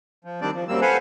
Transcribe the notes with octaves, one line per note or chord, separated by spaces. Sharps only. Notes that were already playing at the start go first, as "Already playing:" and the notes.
F3
D#3 G3 C4 D4 D5
F3
F#2 G3 A#3 C4 E6
A4 B4 C5 F5 F#5 G#5